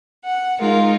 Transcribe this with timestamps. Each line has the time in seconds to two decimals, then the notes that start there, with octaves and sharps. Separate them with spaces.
0.24 F#5
0.59 G#3 D#4 F4 A#4